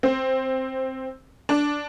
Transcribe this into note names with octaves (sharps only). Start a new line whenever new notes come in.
C4
D4